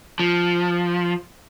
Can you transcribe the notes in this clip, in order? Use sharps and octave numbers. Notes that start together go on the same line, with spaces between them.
F3